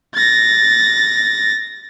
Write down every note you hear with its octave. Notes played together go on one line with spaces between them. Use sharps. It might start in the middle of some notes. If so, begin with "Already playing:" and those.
A6 A#6